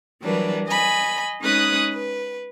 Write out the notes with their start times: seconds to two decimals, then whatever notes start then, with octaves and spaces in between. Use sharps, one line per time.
0.23 E3 F#3 G3 D4 A#4 B4
0.67 D#5 G#5 B5
1.43 G#3 C#4 D#4 B4 D#6 F#6
1.94 B4